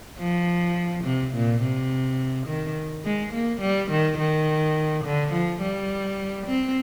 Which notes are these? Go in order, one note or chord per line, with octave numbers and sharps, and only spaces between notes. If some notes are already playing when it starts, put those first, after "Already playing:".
F3
C3
A#2
C3
D#3
G#3
A#3
G3
D#3
D#3
D3
F3
G3
C4